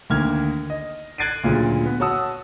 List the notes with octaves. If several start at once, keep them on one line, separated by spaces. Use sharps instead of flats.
D2 D#3 A#3 F6 G#6
D#5
F#6 G#6 A6 C7 D7 D#7
D2 A#2 C#3 F#3
B3
F#4 C#5 F#5 A5 D#6 E6